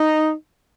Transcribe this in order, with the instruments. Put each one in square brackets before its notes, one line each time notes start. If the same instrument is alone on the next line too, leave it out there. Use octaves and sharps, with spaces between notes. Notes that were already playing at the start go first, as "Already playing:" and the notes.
Already playing: [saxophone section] D#4